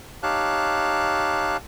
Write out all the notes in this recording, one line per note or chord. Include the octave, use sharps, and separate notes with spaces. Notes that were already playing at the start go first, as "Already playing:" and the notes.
D#4 G4 C#5 F5 A5 F#6